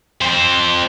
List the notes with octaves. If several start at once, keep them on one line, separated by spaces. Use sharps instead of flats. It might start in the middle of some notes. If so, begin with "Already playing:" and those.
F2 C5